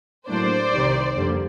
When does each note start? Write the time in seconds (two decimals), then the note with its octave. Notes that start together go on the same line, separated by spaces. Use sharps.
0.28 A2 F#3 A#3 D4 C5 D5
0.72 C2 C3 D#3 G3
1.16 F2 D3 G3 A#3